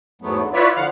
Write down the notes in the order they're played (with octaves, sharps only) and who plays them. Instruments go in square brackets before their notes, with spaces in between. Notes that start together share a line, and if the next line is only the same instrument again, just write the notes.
[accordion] E2 G#2 F#3 A3 B3
D3
E4 F4 B4 C#5 D5 E5
D3 F3 F5 F#5 F6